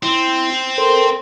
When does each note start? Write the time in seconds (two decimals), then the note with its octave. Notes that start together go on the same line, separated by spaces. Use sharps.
0.03 C4 E4 C6
0.78 A4 A#4 C5 C6